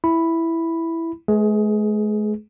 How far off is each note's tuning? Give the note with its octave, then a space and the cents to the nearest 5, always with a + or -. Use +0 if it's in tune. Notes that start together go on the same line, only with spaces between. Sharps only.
E4 +0 B5 +0
G#3 +45 G#4 +15 B4 +0